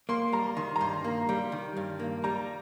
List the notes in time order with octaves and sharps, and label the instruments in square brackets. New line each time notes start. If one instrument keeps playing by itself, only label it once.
[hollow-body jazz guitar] A#3 [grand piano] C6
[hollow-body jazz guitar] G3 [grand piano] A#5
[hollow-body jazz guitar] D#3 [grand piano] C6
[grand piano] A#5
[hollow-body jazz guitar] G2 [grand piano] C6
[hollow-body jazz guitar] A#3
G3
D#3
G2
A#3
[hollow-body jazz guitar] G3 [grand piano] A#5